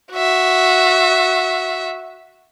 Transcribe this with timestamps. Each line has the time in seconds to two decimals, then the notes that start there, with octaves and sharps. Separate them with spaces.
0.13 F#4 E5